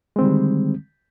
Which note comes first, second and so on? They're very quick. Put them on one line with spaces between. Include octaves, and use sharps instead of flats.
G#3 C4 D#3 G3 D3